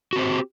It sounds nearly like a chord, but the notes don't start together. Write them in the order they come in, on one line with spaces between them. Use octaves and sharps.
F#4 C4 C5 G4